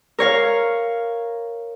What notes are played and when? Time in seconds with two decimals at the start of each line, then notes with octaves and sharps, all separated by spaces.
0.19 A#4 C#5 F5